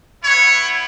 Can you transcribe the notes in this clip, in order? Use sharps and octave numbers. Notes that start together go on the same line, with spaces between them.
B3 E4 C#5